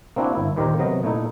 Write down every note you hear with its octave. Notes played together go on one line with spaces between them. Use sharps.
A#3 C4 D4 E4 F#4
G1 E4
D#2 A#2 D#3 G4 A#4 C5
C3 F#3 B3 D#5
A#2 A3 D#4 E4